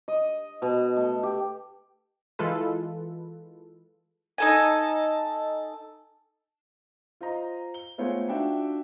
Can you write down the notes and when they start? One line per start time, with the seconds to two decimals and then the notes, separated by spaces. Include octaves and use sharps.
0.08 D#5
0.62 B2
0.96 A3
1.23 G4
2.39 E3 G#3 F4 A4 B4
4.38 D#4 A4 G#5
7.21 F4 C5 D#5 A#5
7.74 G7
7.98 G#3 A3 B3 F4 C5 C#5
8.28 D4 D#4 F4 F#4 E5 G5